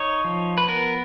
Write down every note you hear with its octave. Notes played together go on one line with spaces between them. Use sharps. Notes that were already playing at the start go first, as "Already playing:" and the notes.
Already playing: D#4 C#5
F3
B4
B3 A#4